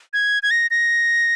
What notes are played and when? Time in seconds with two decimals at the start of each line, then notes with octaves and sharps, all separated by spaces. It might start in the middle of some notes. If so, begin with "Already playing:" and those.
0.13 G#6
0.43 G#6
0.51 A#6
0.71 A#6